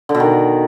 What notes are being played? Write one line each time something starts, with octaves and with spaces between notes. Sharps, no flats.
D3
B2
D#3